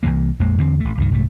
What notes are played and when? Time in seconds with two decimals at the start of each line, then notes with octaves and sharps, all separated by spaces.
0.03 C2 F#2 E3 A#3
0.39 A#1 F2 G#3 A#3
0.58 E2 D3 C4
0.80 A1 A3
0.98 C#2 G2 D#3
1.11 C2 G#2 A3